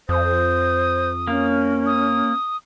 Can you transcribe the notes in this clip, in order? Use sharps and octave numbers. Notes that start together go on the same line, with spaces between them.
F2 C5 D#6
A#3 C#4
D#6